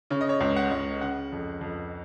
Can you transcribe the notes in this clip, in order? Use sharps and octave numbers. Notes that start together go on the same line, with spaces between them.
C#3 C#5
D#5
C#5
C#2
F#5
C#2
C#3 F#5
F2
F2